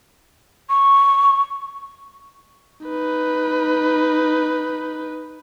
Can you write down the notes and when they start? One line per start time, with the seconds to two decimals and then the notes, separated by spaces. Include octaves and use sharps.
0.69 C#6
2.85 D#4 B4